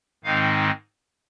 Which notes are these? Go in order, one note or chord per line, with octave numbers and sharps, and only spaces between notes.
G#2 D#3 G#3 C4 D#4 F5